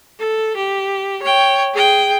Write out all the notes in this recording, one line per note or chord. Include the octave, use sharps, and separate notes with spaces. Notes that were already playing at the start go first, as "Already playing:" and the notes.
A4
G4
C#5 G5
G#4 G5